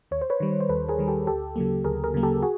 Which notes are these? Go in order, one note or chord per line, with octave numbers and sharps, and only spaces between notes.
D#2 C#5
C5
B4 C#5
D#3 G3
C5
D#2 A4 B4
G#4 A#4
D#3 G3
G4 A4
D2 G4 A4
C#3 F#3 A#3
D2 G#4 A#4
G#4 A#4
C#3 F#3 A#3
G4 A4
F#4 G#4